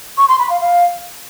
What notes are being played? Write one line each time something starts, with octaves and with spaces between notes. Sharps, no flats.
C#6
C6
B5
F5
F5